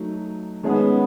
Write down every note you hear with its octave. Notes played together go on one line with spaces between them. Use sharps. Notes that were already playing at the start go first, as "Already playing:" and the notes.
Already playing: F#3 A3 D#4
D#3 G#3 B3 C#4 G#4